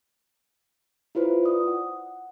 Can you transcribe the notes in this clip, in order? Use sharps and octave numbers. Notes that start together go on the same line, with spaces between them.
E4 F4 B4 C5
D5 D#6
F#5